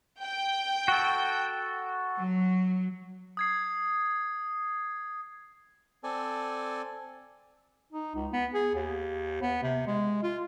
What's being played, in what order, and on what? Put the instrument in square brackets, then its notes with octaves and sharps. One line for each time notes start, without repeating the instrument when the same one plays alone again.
[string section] G5
[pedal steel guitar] F#4 A4
[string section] F#3
[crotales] D#6 G#6 C7
[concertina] C4 A4 D5 G#5
[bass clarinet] D#4
C#2
B3
G#4
D#2
B3
C3
G#3
F4